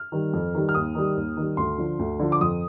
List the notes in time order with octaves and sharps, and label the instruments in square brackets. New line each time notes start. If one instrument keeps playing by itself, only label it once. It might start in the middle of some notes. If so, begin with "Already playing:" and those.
Already playing: [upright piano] F6
D#3 G3
F2
D#3 G3
F6
D#2 D#6
D#3 G3
D#2
D#3 G3
D2 C6
D3 F3
D2
D3 F3
D6
F2 D#6